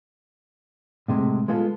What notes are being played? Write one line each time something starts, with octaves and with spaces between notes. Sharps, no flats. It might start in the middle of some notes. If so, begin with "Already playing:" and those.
A2 C3 G#3
G#3 B3 F4 A4